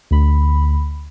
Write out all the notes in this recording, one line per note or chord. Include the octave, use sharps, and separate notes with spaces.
D2 B5